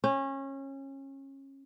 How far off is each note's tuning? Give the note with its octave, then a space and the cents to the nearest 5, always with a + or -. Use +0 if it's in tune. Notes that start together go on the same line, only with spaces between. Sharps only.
C#4 -25